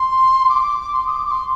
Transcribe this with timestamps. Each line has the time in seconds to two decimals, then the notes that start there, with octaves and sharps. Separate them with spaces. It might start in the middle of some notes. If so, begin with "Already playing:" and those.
Already playing: C6
0.49 D6
0.64 D6
0.79 D6
0.93 C6
1.07 D#6
1.11 D6
1.26 D6
1.31 C6